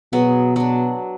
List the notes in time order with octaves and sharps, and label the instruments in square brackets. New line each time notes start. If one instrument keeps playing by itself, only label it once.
[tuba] B2 [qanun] F#3 B3 G#4
[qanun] F#3 D4